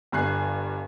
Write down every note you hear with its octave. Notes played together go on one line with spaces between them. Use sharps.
G1 G2 G#5 F#6 C7